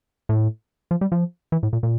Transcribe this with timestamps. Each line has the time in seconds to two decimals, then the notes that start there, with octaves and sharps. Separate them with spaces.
0.29 A2
0.91 F3
1.01 G3
1.12 F3
1.52 E3
1.63 A2
1.73 A#2
1.83 A#2